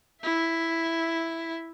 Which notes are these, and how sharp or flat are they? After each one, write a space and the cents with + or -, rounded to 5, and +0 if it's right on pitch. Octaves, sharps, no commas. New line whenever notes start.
E4 +0 E5 +0